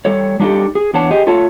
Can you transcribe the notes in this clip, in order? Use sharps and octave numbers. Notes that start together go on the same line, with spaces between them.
G3 A4 C#5
G3 D4 D#4 F#4 G4 A4
G#4
E2 E3 D4 C#5 F#5 A5
G4 G#4 C5 D#5
A3 F4 A4 C#5 A5